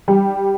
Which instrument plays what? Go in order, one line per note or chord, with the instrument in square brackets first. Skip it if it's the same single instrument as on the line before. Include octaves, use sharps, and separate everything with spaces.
[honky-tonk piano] G3